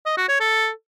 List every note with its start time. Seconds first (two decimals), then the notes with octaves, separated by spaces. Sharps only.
0.06 D#5
0.17 F#4
0.29 C#5
0.40 A4